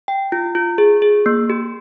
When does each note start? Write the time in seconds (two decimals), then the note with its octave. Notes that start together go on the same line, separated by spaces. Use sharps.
0.08 G5
0.32 F4
0.55 F4
0.78 G#4
1.02 G#4
1.26 A#3
1.50 G4